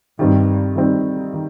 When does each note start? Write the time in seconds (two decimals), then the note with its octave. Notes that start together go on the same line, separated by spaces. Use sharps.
0.19 G2 D#3 G3 C4 D#4
0.76 D#3 G3 C4 D#4
1.33 D#3